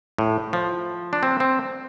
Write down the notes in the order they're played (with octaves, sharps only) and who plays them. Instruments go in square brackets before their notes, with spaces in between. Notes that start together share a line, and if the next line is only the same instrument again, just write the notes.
[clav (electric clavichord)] A2
F3
D4
C4
C4